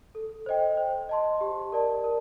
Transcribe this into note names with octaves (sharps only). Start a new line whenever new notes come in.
A4
C5 D#5 G5
C5
D#5 A5 C6
G4
A#4 D5 A5
A#4